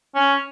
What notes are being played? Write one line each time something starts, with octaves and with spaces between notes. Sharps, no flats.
C#4